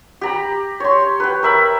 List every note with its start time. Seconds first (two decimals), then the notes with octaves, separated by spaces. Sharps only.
0.21 G4 A#5 B5
0.80 C#5 C6
1.20 B4 G5
1.43 A#4 E5 B5